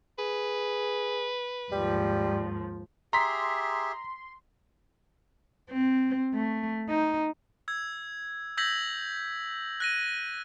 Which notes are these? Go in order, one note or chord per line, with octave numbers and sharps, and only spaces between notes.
G#4 B4
D#2 G#2 F3 G3
G4 G#4 E5 A#5 C6 B6
C4
A3
D#4
E6 G#6
E6 G6 G#6 A#6 B6 F#7
F#6 A#6 D#7